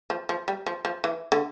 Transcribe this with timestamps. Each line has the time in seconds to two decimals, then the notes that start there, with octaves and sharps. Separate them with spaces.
0.10 F3
0.29 F3
0.48 G3
0.66 F3
0.85 F3
1.04 E3
1.32 D3